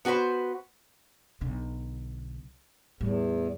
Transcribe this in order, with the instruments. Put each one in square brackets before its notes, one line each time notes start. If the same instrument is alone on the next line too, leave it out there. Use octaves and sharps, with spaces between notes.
[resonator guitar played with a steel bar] B3 F#4 G#4 B4 C5
[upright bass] B1 D3
[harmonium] E2 [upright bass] A2 G3